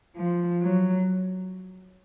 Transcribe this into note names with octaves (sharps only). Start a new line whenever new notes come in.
F3
F#3